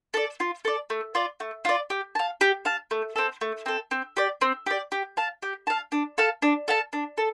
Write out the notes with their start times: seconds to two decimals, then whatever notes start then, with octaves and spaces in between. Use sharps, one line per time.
0.14 A4 D5
0.40 F4
0.65 A4 D5
0.90 A3
1.15 F4 D5
1.40 A3
1.65 F4 D5
1.90 G4
2.15 F5 A5
2.41 G4
2.65 F5 A5
2.91 A3
3.16 C4 A4
3.41 A3
3.66 C4 A4
3.91 C4
4.17 G4 D5
4.41 C4
4.66 G4 D5
4.92 G4
5.17 F5 A5
5.42 G4
5.67 F5 A5
5.92 D4
6.18 A4 F5 A5
6.42 D4
6.68 A4 F5 A5
6.93 D4
7.18 A4